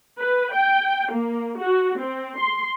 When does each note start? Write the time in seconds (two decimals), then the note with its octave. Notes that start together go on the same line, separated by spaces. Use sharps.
0.19 B4
0.54 G5
1.11 A#3
1.59 F#4
1.98 C4
2.38 C6